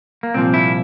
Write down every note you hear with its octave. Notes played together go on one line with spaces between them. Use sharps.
A#3
C2 A#2 F3 C4
E4